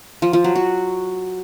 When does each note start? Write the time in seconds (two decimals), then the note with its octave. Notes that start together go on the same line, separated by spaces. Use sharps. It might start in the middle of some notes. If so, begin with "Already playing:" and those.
0.22 F3
0.33 F3
0.44 F#3
0.56 F#4